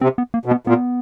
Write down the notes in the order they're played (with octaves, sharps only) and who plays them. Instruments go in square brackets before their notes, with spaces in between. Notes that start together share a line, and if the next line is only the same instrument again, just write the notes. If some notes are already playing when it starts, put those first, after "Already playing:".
[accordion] C3 [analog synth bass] C4
[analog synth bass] B3
A#3
[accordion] B2
[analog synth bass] B3
[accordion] A#2 [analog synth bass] B3